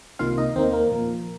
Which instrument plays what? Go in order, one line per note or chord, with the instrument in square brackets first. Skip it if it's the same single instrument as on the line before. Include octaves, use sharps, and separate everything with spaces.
[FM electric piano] C2 C3 D#3 A#3 F4 F5
D#4 D#5
D#2 D#3 A#3 C4 D#4 C5
A#3 A#4
A#2 F3 A#3